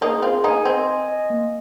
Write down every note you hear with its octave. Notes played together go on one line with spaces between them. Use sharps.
A#3 D#4 G#4
C4 F4 G#4
A#3 D#4 G#5
C4 D#5
G#5
D#5
A#3